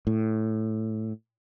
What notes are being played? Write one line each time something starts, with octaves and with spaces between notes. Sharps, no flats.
A2